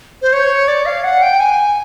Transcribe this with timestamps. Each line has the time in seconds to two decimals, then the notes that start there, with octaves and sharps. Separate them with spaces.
0.22 C5
0.33 C#5
0.68 D5
0.86 F5
1.04 F#5
1.22 G5
1.40 G#5